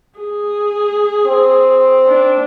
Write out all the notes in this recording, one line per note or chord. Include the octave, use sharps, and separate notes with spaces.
G#4
C4
D4